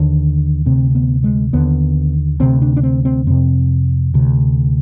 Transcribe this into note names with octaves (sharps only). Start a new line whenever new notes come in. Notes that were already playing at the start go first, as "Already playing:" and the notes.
Already playing: D#2 D3
D2 C3 C4
B3
G#3
D#2 D3 B3
D2 C3 C4
D4
D4
C4
C4
F2 C3 C4
D2 C3